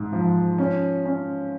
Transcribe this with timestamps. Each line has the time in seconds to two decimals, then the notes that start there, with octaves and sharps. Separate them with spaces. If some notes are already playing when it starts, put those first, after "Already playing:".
Already playing: G#2
0.12 F3
0.58 C#4
1.06 C#4